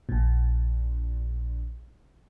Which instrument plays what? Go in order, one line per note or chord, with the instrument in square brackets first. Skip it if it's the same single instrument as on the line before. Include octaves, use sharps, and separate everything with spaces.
[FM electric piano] A#1 A#2